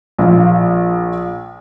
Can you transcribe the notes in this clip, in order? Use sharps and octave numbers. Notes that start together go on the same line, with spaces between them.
A#1 F3